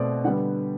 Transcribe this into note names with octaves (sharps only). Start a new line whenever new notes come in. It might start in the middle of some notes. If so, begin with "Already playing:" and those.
Already playing: B2 A3 C4 D5
D3 G3 B3 F#5